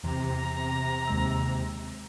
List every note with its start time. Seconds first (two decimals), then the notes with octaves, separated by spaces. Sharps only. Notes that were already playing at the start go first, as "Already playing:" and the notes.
0.04 E2 C3 A#5
1.07 D#2 G#3 E6